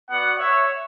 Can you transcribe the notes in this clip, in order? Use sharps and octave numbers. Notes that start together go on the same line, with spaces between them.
B3 F#4 D5 F#5
C#5 E5